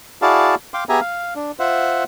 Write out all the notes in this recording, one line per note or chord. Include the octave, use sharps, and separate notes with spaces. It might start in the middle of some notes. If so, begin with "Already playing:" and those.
E4 F#4 G#4 D5 F5 A5
F5 G5 C6 D6
B3 G4 G#4 E5 G#5 A#5
F5
D4
F4 C5 E5 F#5